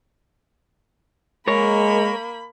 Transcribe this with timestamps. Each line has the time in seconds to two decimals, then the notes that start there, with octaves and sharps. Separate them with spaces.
1.48 G#3 A#3 A#4 C#5 B5